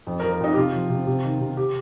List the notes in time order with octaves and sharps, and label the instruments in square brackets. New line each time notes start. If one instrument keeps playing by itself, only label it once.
[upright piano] F2
A#4
F3
A#4
F2 D#4
G4
C3 F4
F3
C3
C3
D#3
C3
G4